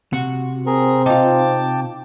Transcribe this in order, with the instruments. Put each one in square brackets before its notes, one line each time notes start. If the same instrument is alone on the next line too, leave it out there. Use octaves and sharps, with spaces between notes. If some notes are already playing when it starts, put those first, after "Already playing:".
[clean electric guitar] C3 [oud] F#4
[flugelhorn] C4 [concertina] G#4 A#4
[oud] D#4 F4 [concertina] G5 A5 D6